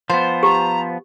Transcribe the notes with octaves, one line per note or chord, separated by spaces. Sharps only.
F3 B3 C5
G4 A#5